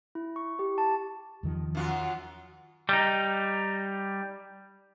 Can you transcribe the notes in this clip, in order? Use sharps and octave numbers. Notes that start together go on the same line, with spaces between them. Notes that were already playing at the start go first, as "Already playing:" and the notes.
E4
C#6
G4
A5
E2 D#3 F3
F#2 F4 F#4
G3 D#4